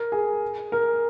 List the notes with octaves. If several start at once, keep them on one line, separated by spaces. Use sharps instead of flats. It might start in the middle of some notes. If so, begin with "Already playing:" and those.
Already playing: A#4
G#4
A#4